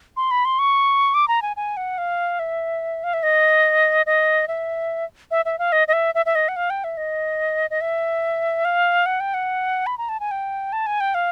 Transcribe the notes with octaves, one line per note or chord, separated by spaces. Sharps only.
C6
B5
C6
C#6
D6
A#5
G#5
G#5
F#5
F5
E5
F5
E5
D#5
D#5
E5
E5
E5
F5
D#5
D#5
E5
E5
E5
D#5
F#5
F5
G5
E5
D#5
D#5
E5
F5
F#5
G5
F#5
B5
A#5
A5
G#5
G5
A5
G#5
G5
F5